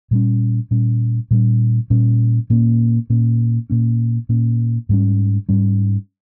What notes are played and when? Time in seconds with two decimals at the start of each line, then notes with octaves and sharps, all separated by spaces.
0.11 A#2 G3 C#4
0.71 A#2 G3 C#4
1.31 A#2 G3 C#4
1.90 A#2 G3 C#4
2.50 A#2 A#3 C#4
3.10 A#2 A#3 C#4
3.70 A#2 A#3 C#4
4.29 A#2 A#3 C#4
4.89 G#2 G3 C#4
5.49 G#2 G3 C#4